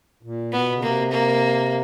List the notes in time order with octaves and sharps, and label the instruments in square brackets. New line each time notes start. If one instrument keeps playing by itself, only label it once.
[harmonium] A#2
[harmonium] B2 [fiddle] B3
[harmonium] C#3
[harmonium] C3 [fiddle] A#3
[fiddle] A#3